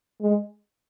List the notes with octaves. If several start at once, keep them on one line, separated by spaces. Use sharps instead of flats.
G#3